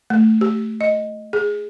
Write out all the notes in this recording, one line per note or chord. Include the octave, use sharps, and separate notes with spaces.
A3
G4
D#5
G#4